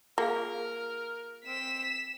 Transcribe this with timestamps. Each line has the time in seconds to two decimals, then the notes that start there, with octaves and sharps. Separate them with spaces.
0.18 A#3 F4 G#4 A#4 F5
1.46 C4 B6 E7